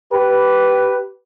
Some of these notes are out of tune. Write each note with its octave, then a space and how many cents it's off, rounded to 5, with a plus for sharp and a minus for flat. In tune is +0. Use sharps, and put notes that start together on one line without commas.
G4 -20 B4 +0